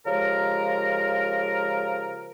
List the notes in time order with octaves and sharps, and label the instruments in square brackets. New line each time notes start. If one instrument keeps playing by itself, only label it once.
[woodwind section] C#3 F3 G#3 G4 A#4